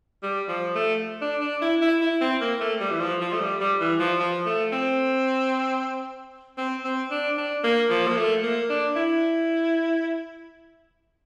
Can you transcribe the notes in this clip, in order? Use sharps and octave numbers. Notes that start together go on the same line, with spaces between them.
G3
F3
A3
D4
D4
E4
E4
E4
C4
A#3
A3
G3
E3
F3
F3
A3
G3
G3
E3
F3
F3
A3
C4
C4
C4
D4
D4
A#3
F3
A#3
A3
A#3
D4
E4